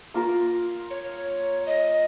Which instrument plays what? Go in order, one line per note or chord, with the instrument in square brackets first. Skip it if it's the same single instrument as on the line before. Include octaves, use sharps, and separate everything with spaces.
[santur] A#3 F4 A#4
[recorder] C#5
D#5